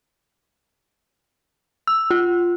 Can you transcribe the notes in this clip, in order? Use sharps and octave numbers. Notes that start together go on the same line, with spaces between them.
E6
F4